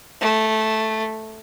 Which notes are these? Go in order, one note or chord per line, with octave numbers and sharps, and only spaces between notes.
A3